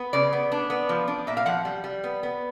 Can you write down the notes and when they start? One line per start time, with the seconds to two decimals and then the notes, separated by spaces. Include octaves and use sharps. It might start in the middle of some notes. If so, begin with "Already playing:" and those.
Already playing: B3
0.13 C#3 D5
0.33 B3
0.52 D4
0.70 B3
0.89 F3
1.08 D4
1.27 A#2 E5
1.37 F5
1.46 F3 F#5
1.65 G3
1.84 G3
2.04 B3
2.23 B3